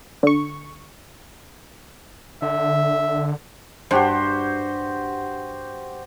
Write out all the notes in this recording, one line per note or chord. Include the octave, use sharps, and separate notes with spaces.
D3 C#6
D3 E5
G2 F#4 G4 C5